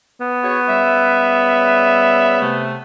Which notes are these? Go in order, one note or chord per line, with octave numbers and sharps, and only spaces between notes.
B3
F#4 G#4 C#5
C#3 G3 E5
C3 A3